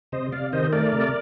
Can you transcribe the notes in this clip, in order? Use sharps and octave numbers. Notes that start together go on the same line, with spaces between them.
C3 C5 D#5
C3 D5 F5
D#3 C5 D#5
A3 A#4 D5
C3